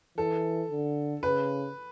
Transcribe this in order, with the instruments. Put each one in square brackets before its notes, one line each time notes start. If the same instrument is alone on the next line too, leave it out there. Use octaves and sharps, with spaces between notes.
[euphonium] E3 [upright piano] A4
[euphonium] D3
[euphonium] C#3 [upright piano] B4